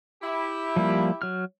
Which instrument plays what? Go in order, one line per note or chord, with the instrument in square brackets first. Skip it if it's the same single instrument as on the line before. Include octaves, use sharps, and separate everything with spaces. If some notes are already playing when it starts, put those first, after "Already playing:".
[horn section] E4 G4
[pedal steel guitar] F3 G3 A#3
F#3 F6